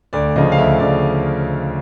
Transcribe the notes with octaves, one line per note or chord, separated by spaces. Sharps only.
D2 D5
C#3 F3 D#5
F5
D2 E5
C#3 D5